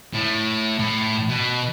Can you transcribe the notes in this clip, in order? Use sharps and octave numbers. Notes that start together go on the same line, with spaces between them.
A2
A2
B2